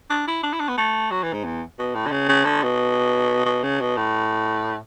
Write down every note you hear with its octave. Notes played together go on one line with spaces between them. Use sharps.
D4
E4
D4
E4
D4
B3
A3
F#3
E3
G#2
E2
B2
A2
D3
C#3
C#3
D3
B2
B2
C#3
B2
A2